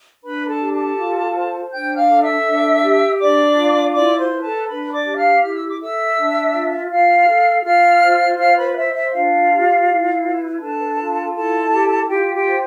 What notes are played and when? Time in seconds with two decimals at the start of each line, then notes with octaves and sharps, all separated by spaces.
0.24 D4 B4 B5
0.48 A4 A5
0.61 G4
0.73 A4 A5
0.97 F4
1.35 C5
1.71 D4 G5 G6
1.96 F5 F6
2.09 A4
2.22 E5 E6
2.45 D4
2.83 G4
3.20 D4 D5 D6
3.57 F4
3.94 E4 D5 D6
4.18 C5 C6
4.31 B4
4.43 A4 A5
4.68 D4 B4 B5
4.92 D5 D6
5.06 G4
5.17 F5 F6
5.42 E4 F6
5.55 E6
5.69 D6
5.80 A4 E5 E6
6.17 D4
6.54 F4
6.91 F4 F5 F6
7.27 A4
7.64 F4 F5 F6
8.01 C5
8.38 F4 F5 F6
8.58 B4 B5
8.75 C5 E5
8.94 E5
9.12 D4 F4 F5
9.50 G4
9.87 E4
10.23 B4
10.60 D4 A4 A5
10.99 F4
11.35 E4 A4 A5
11.72 G4
12.09 F4 G4 G5
12.34 G4 G5
12.46 C5